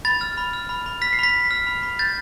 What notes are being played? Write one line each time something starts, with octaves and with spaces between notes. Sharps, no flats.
B5 A6
F6
B5
F6
B5
B5
F6 B6
C7
B5 B6
B5
F6
B5
B5
G6 A6